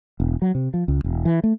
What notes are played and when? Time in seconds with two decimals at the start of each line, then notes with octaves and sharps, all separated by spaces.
0.20 E1
0.42 F#3
0.55 C3
0.74 F3
0.88 C#2
1.04 E1
1.25 E3
1.44 A3